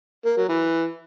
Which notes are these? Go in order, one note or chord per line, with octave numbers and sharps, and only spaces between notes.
A#3
F#3
E3